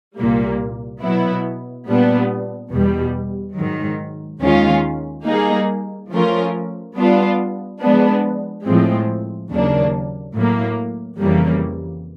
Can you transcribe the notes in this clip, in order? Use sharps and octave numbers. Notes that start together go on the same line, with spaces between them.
C2 A#2 G3 A#3
B2 F#3 B3 E4
A#2 G3 B3 D4
E2 B2 G3
G#2 D#3 F#3
D#2 D#3 G#3 C#4 F4
G3 A#3 D#4 G#4
F3 A3 C#4 F4 A#4
G3 B3 D4 F4
F3 G#3 B3 D4
A2 F3 G#3 C4
D#2 C#3 F#3 A#3 D4
A2 F#3 A#3
F2 C#3 E3 G3 A#3